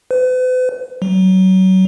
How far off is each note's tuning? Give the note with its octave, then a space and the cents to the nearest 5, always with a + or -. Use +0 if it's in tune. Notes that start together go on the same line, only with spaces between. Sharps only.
B4 +45
F#3 +25